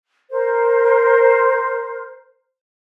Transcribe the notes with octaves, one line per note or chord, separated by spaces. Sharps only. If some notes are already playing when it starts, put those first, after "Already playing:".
A#4 C5